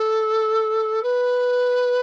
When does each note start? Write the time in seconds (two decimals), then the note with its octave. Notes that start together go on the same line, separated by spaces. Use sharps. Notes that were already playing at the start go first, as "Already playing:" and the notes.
Already playing: A4
1.03 B4